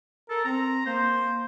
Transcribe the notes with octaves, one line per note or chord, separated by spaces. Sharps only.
A4 A#4
C4 A#5
A#3 C5